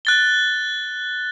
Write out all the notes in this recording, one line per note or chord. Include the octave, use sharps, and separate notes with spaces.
F#6 A6 G7